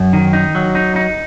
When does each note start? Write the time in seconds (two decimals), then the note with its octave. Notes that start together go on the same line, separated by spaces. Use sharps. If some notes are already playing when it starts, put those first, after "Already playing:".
Already playing: F#2
0.13 D#3
0.33 D#4
0.55 F#3
0.75 D#4
0.96 D#4